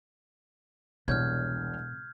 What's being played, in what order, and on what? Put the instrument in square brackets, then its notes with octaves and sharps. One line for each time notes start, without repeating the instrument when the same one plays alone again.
[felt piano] E1 C2 C#5 [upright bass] B2 [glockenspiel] F6 G6 G#6